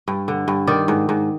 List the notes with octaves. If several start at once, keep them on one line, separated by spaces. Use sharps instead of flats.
G2
D3
G2
D#3 D5
G#2
G#2